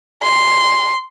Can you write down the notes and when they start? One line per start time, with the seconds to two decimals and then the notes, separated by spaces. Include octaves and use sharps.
0.23 C6